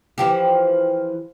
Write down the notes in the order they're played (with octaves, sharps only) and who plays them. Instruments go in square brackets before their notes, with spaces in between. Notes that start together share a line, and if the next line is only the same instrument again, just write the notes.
[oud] E3 F3 G4